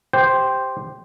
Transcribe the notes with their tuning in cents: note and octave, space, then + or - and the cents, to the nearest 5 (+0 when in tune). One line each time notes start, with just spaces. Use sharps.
G4 +0 C5 +0 G5 +0